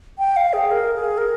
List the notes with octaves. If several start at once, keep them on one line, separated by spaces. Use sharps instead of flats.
G5
F5
G#4
A#4
G#4
A#4